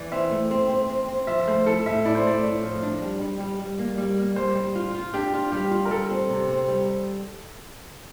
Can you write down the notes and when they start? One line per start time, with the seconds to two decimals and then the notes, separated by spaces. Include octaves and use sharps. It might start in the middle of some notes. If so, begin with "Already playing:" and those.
Already playing: E3 D5
0.12 C4 E5
0.31 A3
0.51 C4
0.70 C4
0.89 C4
1.08 C4
1.27 F3 E5
1.47 A3 C5
1.66 E4 A4
1.86 A2 E5
2.05 E4 D5
2.15 C5
2.24 A3 D5
2.44 A2
2.63 F3
2.82 D4
3.02 G3
3.21 G3
3.40 G3
3.60 G3
3.79 A#3
3.98 G3
4.17 A#3
4.36 G3 C5
4.56 G3
4.75 F4
4.94 F4
5.14 D4 G4
5.33 F4
5.52 G3 G4
5.71 F4
5.85 A#4
5.91 G3 A4
6.11 C4
6.30 C3
6.49 C4
6.68 G3